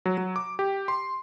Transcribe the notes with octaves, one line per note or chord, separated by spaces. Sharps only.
F#3
F#3
D6
G4
C6